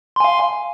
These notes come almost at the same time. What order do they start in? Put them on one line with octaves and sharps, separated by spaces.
C6 G#5 F5